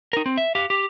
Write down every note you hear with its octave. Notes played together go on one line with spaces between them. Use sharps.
D#4 A#4
C4
E5
G4 F5
G4